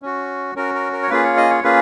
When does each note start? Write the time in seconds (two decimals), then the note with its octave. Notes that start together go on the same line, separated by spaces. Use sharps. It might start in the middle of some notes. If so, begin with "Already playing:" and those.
0.02 C#4 F#4
0.55 C#4 F#4 A#4
0.74 A#4
0.93 A#4
1.03 C#5
1.10 A#3 C#4 F4 G#4 B4
1.24 C#5
1.37 D#5
1.50 C#5
1.63 A#3 C#4 F4 G#4 B4